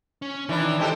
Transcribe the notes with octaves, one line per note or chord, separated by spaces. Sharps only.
C#4
D#3 E3 D4 E4
G#3 G4 A4 C5